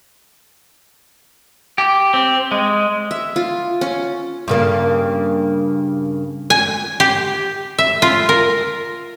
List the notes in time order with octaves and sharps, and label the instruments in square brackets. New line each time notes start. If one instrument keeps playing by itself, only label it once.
[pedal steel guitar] G4
C4
G#3
[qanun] E5
F4
C#4
[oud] G2 C#3 A#3
[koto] G#5
G4
E5
F4
A#4